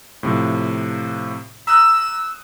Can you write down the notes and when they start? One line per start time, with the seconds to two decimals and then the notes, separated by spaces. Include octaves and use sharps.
0.23 A2 C3 F3
1.67 A#5 D#6 E6 F#6